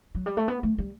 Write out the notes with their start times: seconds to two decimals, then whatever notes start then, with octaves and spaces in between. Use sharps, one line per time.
0.15 F#3
0.26 G3
0.37 A3
0.48 B3
0.63 A3
0.78 G3